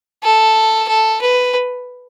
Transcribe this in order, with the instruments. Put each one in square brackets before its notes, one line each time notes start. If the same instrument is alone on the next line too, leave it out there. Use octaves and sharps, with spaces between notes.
[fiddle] A4
A4
B4